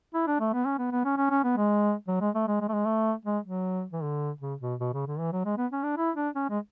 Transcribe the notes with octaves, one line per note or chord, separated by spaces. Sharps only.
E4
D4
A3
B3
C#4
B3
B3
C#4
C#4
C#4
B3
G#3
F#3
G#3
A3
G#3
G#3
A3
G#3
A3
G#3
F#3
E3
D3
C#3
B2
B2
C#3
D3
E3
F#3
G#3
B3
C#4
D4
E4
D4
C#4
G#3